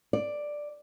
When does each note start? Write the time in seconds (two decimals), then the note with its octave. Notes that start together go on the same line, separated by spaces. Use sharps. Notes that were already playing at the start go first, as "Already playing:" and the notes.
0.13 D5